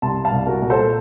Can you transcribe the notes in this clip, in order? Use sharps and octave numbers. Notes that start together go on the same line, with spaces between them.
C2 A5 C6
F5 A5
C2
F#4 A#4
A#2
A4 C5